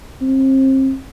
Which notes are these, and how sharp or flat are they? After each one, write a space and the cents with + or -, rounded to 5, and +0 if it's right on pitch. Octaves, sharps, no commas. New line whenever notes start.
C4 +30